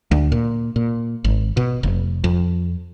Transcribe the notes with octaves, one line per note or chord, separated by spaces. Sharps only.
D2
A#2
A#2
G#1
B2
F1
F2